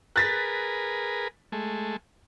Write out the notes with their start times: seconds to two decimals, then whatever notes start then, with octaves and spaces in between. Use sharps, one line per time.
0.16 G#4 A#4 B4 F#6 A6 B6
1.52 G#3 A3